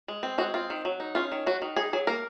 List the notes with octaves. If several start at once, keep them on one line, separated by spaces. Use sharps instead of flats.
G#3
C4
G#3 F#4
C4 F4
D#3
F#3
D#4
C#4 F4
D#3
F#3 F#4
D#3
D#4 G#4
F#3 G#4
A#3 A#4